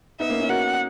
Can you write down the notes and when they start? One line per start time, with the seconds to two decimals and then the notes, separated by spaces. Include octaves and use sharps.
0.20 B3 D#4 E5
0.30 A#3 C#4
0.40 C#4 E4
0.49 F#4 A#4 F#5